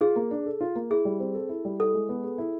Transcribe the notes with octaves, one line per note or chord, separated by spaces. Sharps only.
F4 G#4
A#3
D4
A4
F4
A#3
E4 G#4
G3
C4
A4
E4
G3
E4 A4
G#3
B3
G#4
E4